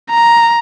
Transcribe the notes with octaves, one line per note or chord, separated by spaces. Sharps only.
A#5